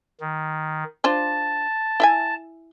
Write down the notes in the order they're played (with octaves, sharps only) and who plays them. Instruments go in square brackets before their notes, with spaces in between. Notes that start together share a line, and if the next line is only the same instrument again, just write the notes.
[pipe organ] D#3
[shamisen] D4 F4 C5 [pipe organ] A5
[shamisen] E4 E5 G#5